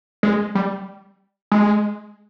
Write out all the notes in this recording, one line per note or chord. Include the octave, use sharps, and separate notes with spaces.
G#3
G3
G#3